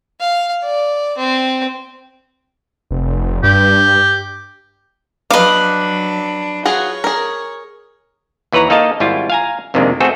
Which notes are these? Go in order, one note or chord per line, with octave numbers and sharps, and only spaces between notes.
F5
D5
C4
F1
G2 G4
F#3 D4 B4 D#5 F5 D6
F4 F#4 G#4 C#5
G#4 A#4
D#2 E3 B4 C#5 A#5
A#3 D#4 A4 D#5 F5 A5
G#1 G3 E4 F4
F5 G#5 A#5
F2 C3 D#3 G#3 A#3 D4
A3 C4 F#4 G#4 A4